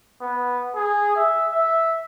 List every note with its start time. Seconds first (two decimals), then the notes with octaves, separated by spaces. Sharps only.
0.21 B3
0.76 G#4
1.16 E5
1.52 E5